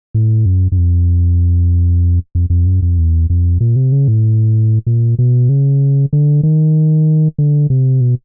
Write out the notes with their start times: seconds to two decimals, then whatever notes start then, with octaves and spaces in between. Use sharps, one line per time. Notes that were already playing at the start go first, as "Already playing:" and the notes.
0.15 A2
0.46 F#2
0.72 F#2
0.78 F2
2.35 F2
2.50 F2
2.66 F#2
2.82 F2
2.98 E2
3.30 F2
3.60 A#2
3.76 C3
3.92 C#3
4.08 A2
4.87 A#2
5.19 B2
5.49 C#3
6.13 D3
6.43 D#3
7.38 D3
7.70 C3
8.01 B2